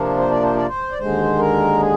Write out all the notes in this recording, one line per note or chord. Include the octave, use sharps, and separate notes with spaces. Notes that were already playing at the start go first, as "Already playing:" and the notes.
Already playing: C3 F3 A#3 D4
C5
D5
C5
D5
C5
D5
D#2 D3 G#3 C5
A#4
G#4